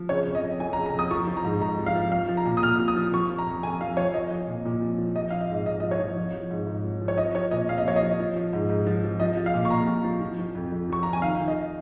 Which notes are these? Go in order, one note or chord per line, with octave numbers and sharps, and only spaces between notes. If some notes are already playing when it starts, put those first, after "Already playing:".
Already playing: F3
C#3 C#5
F2
D#5
F2
F3 G#5
A#5
C#3
A#5
F2 D#6
F3 C#6
F3
A#5
G#2
G#2 A#5
F3
F5
F3
F3 F5
F3
A#5
A#2
D#6
A#2 F6
F3
D#6
F3
F3 C#6
F3
A#5
F2
F2 G#5
F3 F5
F3 C#5
F3 D#5
F3
A#2
A#2
F3
F3
F3 D#5
F3 F5
D#5
G#2
G#2 D#5
F3 D#5
C#5
F3
F3
F3
G#2
G#2
F3
F3
C#5
F3 D#5
F3 C#5
A#2 D#5
A#2 F5
D#5
F3 C#5
D#5
F3
F3
F3
G#2
G#2
F3
F3
F3 D#5
F3
F5
A#2
C#6
A#2 A#5
F3
F3
F3
F3
F2
F2
F3 C#6
F3 A#5
G#5
D#3 F5
D#3
D#5